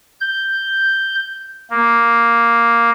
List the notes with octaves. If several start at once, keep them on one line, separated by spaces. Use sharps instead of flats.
G6
A#3